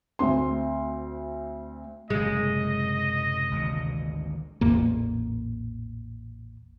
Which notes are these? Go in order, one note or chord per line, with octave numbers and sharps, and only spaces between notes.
D2 C4 C6
F#1 F#2 A2 C3 G#3 D#5
G#1 D2 A#2
A1 E2 A#2 A#3